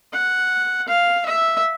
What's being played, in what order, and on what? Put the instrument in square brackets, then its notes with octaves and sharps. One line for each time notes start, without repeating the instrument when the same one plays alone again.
[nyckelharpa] F#5
F5
E5